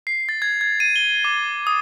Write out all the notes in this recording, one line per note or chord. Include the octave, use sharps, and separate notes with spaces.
C7
A6
G#6
G#6
D#7
G7
D6
D#6